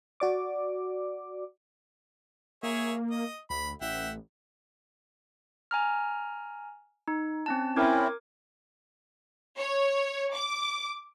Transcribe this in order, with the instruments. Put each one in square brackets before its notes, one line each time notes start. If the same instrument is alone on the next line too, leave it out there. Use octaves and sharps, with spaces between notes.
[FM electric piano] F#4 D5 D6
[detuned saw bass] A#3 [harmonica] G#4 C#5 E5
[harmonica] D#5
[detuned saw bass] D2 [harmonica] B5
[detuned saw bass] A1 [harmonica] E5 F#5 G5
[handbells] G#5 A#5 F6
D#4
C4 C#4 A5
[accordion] C4 C#4 E4 [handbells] A#4 D6 G#6
[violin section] C#5
D6